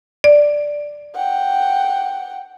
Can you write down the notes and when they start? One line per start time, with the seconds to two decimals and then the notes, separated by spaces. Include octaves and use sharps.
0.24 D5
1.15 F#5 G5